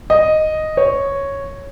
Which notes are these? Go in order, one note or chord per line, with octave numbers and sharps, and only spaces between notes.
D#5
C#5